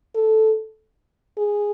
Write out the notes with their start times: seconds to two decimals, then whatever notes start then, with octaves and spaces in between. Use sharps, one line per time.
0.15 A4
1.38 G#4